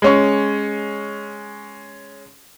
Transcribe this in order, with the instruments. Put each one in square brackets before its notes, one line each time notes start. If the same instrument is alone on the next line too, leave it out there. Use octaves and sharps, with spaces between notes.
[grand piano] G#3 C#4 C#6